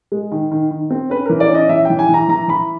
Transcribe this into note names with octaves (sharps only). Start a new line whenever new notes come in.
G#3
D#3
D#3
D#3
C4
C#4 B4
E3 A#4
D5
C#4
D#5
E3 E5
E3 G5
G#5
E3
A#5
E3 A#5
E3 B5